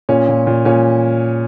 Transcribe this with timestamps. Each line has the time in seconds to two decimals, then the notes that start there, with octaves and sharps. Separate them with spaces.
0.09 A#2 C#4
0.29 A#2
0.47 A#2
0.65 A#2 C#4